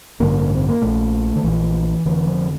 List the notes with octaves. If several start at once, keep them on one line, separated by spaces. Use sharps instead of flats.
A1 G2 D3 A#3
C4
A#3
A#1 A#2 A3
D3
A#1 A#2 E3
F1 F2 D3 E3
F3